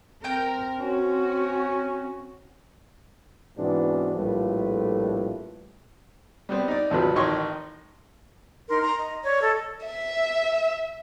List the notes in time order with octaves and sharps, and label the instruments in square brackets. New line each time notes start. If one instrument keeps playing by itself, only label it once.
[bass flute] C4 [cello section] A#4 [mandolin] C5 G5 G6
[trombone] C#4 [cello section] F#4
[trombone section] G#2 B2 E3 B3 C4 D4
A#1 A2 G3 A3 F4 B4
[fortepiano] G3 B3 C4
D#4 D5
G#1 D2 C3 F3 F#3 B4
A1 D#3 D#4 C#5 C6 C#6
[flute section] D#4 A#4 C6
A#4 A#5 C6
D#5
C#5 D5
A4 D#5
[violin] E5